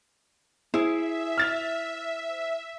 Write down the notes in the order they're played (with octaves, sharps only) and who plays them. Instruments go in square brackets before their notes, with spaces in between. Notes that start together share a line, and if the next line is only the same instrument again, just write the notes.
[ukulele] E4 [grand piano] G#4 [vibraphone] C5 [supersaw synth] E5
[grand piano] F6 A6 F7